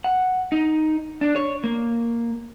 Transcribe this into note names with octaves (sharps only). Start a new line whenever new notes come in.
F#5
D#4
D4
C#5
A#3